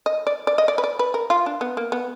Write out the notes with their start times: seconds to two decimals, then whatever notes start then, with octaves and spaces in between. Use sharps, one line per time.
0.06 D#5
0.27 D5
0.47 D5
0.58 D#5
0.68 D5
0.78 B4
0.84 D5
0.99 B4
1.14 A#4
1.30 F4
1.46 D4
1.61 B3
1.77 A#3
1.92 B3